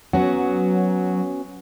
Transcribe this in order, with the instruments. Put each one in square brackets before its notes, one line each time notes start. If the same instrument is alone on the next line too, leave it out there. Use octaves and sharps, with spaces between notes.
[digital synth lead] F#3 [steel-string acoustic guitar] B3 C#4 F#4